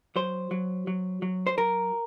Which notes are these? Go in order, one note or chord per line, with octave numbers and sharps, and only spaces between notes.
F#3 C5
F#3
F#3
F#3
C5
F#3 A#4